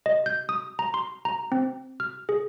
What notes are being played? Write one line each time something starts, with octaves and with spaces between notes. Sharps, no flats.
D#5
G6
D#6
A#5
C6
A#5
C4
F6
G#4